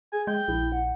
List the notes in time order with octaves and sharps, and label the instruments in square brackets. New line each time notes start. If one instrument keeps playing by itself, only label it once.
[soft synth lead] G#4 [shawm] G#5
[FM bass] G#3 [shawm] G5
[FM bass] A#1 [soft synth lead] E4
[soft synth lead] F#5